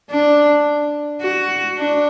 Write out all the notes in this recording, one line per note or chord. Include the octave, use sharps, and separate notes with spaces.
D4
F#4
D4